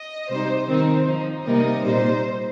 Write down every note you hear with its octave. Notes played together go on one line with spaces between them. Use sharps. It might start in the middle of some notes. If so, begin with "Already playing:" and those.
Already playing: D#5
C3 G3 D#4 C5
D#3 C4 D#4 C5
F3 D#4
C3 G3 A#3 D#4 D#5
A#2 G3 D#4 C5